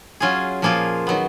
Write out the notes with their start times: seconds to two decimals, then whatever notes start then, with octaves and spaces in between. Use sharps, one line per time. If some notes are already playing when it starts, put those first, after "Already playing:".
0.20 F#3 C#4 F4 G#4
0.62 A#2 F3 A#3 F4 G#4
1.07 D#3 F#3 B3